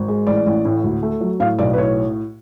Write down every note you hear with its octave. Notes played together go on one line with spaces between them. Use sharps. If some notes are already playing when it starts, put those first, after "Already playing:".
Already playing: G#1
G#3
A1 D5
A1
A2
D2
A3
F#3
A2 F5
B1 D5
B4
A2 C#5